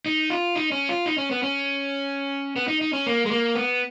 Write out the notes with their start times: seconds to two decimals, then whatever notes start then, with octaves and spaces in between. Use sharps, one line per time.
0.06 D#4
0.30 F4
0.55 D#4
0.72 C#4
0.89 F4
1.06 D#4
1.18 C#4
1.31 B3
1.43 C#4
2.56 B3
2.68 D#4
2.81 D#4
2.93 C#4
3.07 A#3
3.26 G#3
3.31 A#3
3.55 B3